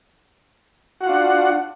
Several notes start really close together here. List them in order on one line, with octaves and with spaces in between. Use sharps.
F#4 F#5 F4 D4